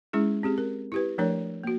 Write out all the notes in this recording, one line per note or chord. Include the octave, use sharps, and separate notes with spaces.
G#3 C#4 E4 G#4
C4 G4 G#4
A#4
E4 G4 B4
F3 A3 D4 A#4 C#5
A#3 F#4